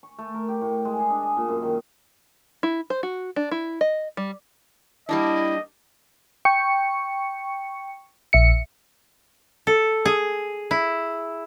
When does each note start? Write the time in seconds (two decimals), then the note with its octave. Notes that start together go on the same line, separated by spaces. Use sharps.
0.03 C#6
0.19 A3
0.34 A#4
0.49 G4
0.61 A2
0.85 G#3
0.99 G#4
1.10 D4
1.23 D#5
1.37 A#2
1.48 F#2
1.62 D#3
2.63 E4
2.90 C5
3.03 F#4
3.36 D4
3.51 E4
3.81 D#5
4.17 G3
5.09 G3 A#3 D4 E4 D#5
6.45 G5 C#6 C#7
8.33 A#1 E5 C#7
9.67 A4
10.05 G#4
10.71 E4